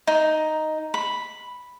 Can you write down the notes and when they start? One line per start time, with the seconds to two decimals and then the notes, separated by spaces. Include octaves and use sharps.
0.07 D#4
0.94 B5